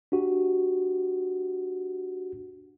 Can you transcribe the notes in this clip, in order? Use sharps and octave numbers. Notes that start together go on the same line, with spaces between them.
D4 F#4 G4